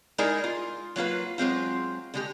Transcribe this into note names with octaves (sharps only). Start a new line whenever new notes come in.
G#3 D#4 E4 G#4 A#4 D5
F4
F#3 A#3 F4 B4
F#3 G#3 C4 F4
D3 G#3 G4